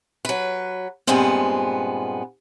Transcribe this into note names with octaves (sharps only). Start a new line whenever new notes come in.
F#3 B4
G2 A#2 G#3 B3 C4